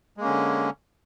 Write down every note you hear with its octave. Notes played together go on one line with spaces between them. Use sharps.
D3 G#3 A#3 C#4